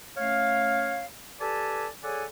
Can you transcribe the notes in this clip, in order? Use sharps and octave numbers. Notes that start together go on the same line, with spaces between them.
A3 C#4 C#5 F5
G4 A4 B4 D5 G#5 A5
G#4 A4 C#5 D5 F#5 G#5